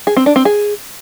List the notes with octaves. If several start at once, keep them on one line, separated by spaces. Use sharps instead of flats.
G#4
C4
D4
C4
G#4